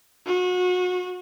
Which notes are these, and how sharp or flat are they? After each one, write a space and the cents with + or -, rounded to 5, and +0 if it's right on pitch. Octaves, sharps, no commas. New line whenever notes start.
F#4 -30